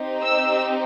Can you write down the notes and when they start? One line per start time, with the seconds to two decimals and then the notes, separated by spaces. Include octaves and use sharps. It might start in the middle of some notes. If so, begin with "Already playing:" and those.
Already playing: C4 D#4 G4
0.21 E6